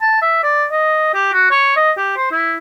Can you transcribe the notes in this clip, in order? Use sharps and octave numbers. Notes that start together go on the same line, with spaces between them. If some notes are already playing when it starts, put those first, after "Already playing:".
A5
E5
D5
D#5
G4
F#4
C#5
D#5
G4
C5
E4